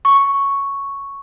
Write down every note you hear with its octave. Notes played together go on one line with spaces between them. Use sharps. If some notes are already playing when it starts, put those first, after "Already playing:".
C#6